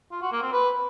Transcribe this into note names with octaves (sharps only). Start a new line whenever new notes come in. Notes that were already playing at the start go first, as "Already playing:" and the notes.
F4
F#4
A#3
C4
B4